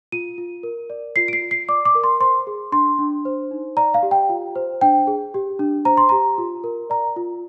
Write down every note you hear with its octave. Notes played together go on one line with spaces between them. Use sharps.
F4 D#7
F4
A#4
D5
F4 C7
D7
C7
F4
C7
D5 D6
D6
A#4
C6
C5 C6
G#4
D4 C6
D4
C5
D#4
D5 A#5
F5
G4
G5
F4
C5
D4 G5
G#4
G4
D4
C5 A#5
C6
G4 A#5
F4
A#4
D5 A#5
F4